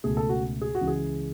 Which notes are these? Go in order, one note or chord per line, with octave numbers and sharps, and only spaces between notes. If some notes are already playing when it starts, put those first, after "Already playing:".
C#2 B2 A3 G#4
A4
F#4
G#4
F#4
C#2 C#3 E3
G#4